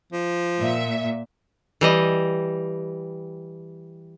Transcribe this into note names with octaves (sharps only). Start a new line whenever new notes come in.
F3
A#2 E5
E3 G3 D#5